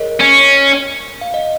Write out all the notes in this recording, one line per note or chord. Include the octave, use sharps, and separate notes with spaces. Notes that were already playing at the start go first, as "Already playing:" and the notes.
Already playing: G#4 A#4 C#5 D#5
C#4
F5
D#5